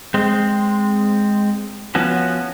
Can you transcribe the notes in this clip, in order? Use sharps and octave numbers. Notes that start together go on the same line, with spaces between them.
G#3 C4
F3 B3 C#4 F#4